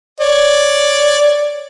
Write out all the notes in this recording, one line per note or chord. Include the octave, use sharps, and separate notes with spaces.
C#5 D5